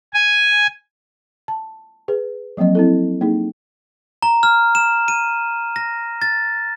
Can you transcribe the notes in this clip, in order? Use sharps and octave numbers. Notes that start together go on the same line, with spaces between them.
G#5
A5
G#4 B4
F3 F#3 A#3 C4 D#5
C4 E4 A4
A#3 D#4 G#4
A#5
F6
E7
D#7
A#6
A6